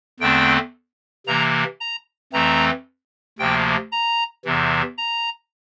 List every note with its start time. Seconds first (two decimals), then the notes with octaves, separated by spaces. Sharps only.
0.20 E2 D3 A3 C4 G5
1.27 C3 E3 A#3 A#5
1.80 A#5
2.32 F2 E3 A3 C4 A#5
3.38 D2 C3 F3 A#3 G5
3.92 A#5
4.45 E2 C3 E3
4.97 A#5